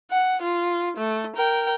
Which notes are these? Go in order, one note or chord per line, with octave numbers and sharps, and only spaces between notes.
F#5
F4
A3
A#4 G5